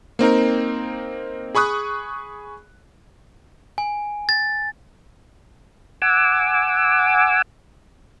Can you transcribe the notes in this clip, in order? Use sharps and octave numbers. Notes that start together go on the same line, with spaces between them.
A#3 C4 D#4 A#4
G#4 B5 C#6 D#6 F#6
G#5
A6
F#5 G#5 D6 E6